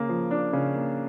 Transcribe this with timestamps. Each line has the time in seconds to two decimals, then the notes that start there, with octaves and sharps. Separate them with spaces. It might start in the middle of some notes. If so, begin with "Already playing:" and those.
Already playing: C#3 A#3
0.09 F3
0.31 D4
0.53 C#3
0.74 A#3